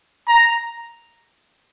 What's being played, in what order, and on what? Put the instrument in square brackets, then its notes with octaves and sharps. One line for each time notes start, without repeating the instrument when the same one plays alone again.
[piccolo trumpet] A#5